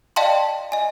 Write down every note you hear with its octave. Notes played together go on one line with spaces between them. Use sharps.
D5 D#5 F5 G5 A5 C6
D#5 G#5